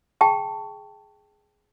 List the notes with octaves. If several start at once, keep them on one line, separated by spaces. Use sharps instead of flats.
G#4 G5 A5 C#6